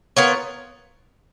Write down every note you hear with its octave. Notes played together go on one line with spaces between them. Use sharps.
B3 F4 A#4 C#5